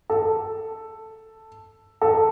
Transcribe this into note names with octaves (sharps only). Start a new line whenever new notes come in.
A4
A4